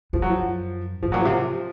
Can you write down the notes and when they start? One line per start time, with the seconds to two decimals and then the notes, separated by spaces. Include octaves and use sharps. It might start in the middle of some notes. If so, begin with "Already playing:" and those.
0.13 F#2 F3
0.22 F#3
0.30 F3
1.03 A2 F3
1.12 A#2 F#3
1.21 C3 F3